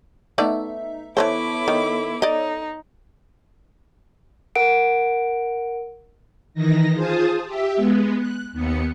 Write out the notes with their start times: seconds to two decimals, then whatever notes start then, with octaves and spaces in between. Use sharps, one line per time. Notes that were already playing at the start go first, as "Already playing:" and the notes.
0.38 A3 B3 D#4 D5 E5
1.17 E3 A3 B3 E4 A4 C5 C#5 D6
1.68 D#3
2.22 D#4 D5 D#5
4.56 A#4 F#5 D7
6.54 D#3 E3 D#4 A#6
6.94 F4 G#4 C5 A5 D#6
7.44 G4 E5
7.76 G#3 B3
8.17 F#6
8.52 D#2 B3 C#7